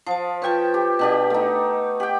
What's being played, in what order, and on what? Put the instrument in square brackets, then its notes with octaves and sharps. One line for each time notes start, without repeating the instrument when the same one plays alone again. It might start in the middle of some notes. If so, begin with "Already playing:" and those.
[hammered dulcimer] F3 [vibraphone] C5 A5
[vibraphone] F4 B4 [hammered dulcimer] C#5 G5 A5
[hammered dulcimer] G4
[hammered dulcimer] B2 D4 G4 [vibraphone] B4 F#5
[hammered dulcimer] A3 D#4
[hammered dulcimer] G4 G5 [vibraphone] F#5